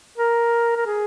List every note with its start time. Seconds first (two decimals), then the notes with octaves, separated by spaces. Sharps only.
0.18 A#4
0.77 A#4
0.86 G#4